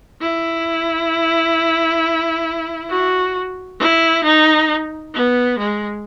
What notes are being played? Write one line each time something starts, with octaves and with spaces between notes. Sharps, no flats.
E4
F#4
E4
D#4
B3
G#3